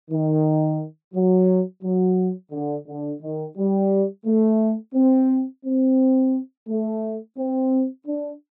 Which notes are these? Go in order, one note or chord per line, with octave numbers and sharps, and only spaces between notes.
D#3
F#3
F#3
D3
D3
D#3
G3
A3
C4
C4
A3
C4
D4